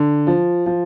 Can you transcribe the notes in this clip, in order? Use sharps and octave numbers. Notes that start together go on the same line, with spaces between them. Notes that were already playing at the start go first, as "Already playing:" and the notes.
Already playing: D3
F3
F3